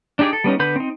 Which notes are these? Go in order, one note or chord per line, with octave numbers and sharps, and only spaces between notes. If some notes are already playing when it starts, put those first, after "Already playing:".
D4 D#4 G4 G#4 D5
A4
G3 B3 C#4 D#4
D3 B3 B4 B5 G6
C4 D#4